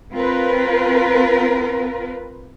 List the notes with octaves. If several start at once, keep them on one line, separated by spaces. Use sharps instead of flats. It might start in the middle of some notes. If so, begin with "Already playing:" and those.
C4 F4 A#4 B4